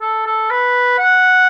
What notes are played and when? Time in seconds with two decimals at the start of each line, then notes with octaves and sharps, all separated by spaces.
0.01 A4
0.26 A4
0.50 B4
0.98 F#5